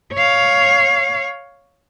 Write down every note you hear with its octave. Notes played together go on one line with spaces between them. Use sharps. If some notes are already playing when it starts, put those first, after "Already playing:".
C#5 F5